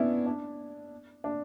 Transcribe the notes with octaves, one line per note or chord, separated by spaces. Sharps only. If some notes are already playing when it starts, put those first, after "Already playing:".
Already playing: B3 C#4 D4 E4
D4
D4